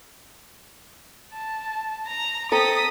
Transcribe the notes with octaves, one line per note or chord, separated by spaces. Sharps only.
A5
A#5
C4 A4 A#5 D#6 B6